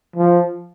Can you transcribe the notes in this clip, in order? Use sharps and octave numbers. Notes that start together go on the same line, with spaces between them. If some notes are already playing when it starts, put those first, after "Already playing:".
F3